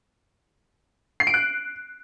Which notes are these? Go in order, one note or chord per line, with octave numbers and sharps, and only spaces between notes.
C7
D7
F#6